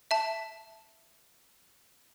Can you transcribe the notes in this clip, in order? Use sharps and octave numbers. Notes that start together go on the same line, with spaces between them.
E5 A5